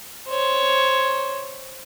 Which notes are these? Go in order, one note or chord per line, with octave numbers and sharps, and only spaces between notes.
C5 C#5